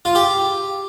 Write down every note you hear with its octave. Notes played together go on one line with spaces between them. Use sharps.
F4
G4